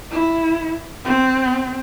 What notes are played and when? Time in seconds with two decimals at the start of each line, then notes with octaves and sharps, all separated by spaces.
0.11 E4
1.05 C4